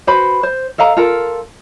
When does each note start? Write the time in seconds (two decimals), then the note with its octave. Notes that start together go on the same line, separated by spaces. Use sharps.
0.07 F#4 B4 C5 B5
0.43 C5
0.78 A4 D#5 F5 A#5
0.97 F4 A4 A#4